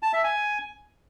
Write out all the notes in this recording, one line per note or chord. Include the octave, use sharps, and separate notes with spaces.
A5
E5
G#5